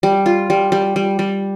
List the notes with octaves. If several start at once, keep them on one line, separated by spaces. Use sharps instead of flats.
G3
F4
G3
G3
G3
G3